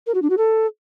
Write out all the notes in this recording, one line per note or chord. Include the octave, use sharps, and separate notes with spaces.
A#4
F#4
D4
F#4
A4